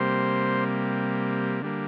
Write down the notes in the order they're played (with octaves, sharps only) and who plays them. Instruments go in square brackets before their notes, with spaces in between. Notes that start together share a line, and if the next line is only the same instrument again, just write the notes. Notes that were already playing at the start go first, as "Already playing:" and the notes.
Already playing: [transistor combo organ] C3 G3 A#3 C5
D3 G3 A#3